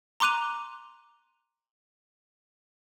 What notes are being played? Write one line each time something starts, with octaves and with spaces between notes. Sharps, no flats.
A#5 C6 D6 F#6 D#7 F7